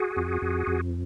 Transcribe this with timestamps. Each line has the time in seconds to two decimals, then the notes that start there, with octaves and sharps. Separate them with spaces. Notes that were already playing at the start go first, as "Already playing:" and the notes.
Already playing: F#4 G#4
0.17 F2
0.42 F2
0.67 F2